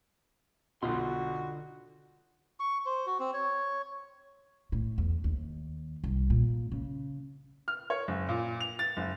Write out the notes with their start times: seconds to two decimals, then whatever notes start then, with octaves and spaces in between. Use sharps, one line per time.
0.82 B1 B2 D3 F4 F#4 C6
2.60 C#6
2.86 C5
3.07 F#4
3.19 C4
3.34 C#5
4.72 A2
4.98 E2
5.24 D#2
6.04 C2
6.30 A#2
6.72 C#3
7.68 F6
7.90 C#5
8.08 F#1
8.29 A#2
8.60 F7
8.79 A6
8.97 F#1